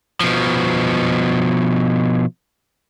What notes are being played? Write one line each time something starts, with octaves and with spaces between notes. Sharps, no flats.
B2 F3